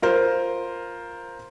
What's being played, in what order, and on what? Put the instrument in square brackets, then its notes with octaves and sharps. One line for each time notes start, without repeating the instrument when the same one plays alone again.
[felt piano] F4 A#4 C5